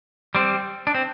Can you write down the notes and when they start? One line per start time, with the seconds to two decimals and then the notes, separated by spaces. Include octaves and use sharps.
0.35 G3 C4
0.87 D4
0.95 C4